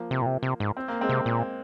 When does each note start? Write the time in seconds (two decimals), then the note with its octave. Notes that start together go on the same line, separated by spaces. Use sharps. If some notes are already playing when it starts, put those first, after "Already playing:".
Already playing: F3 A#3
0.11 C3
0.22 A#2
0.26 C3
0.43 C3
0.60 G#2
0.77 C4
0.88 A#3
1.01 G#3 C4
1.09 C3
1.26 A#2